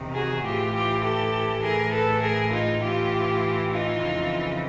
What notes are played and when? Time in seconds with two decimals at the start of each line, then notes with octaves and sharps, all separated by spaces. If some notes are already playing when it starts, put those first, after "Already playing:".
Already playing: E2 C3 D#3
0.14 F#4 G#4
0.44 A2 E3 F4 G4
0.74 F4 G4
1.03 G4 A4
1.62 A2 E3 G#4 A#4
1.92 A4 B4
2.22 G#4 A#4
2.51 D#4 F4
2.81 A2 E3 F4 G4
3.70 D#4 F4
3.99 F2 C#3 E3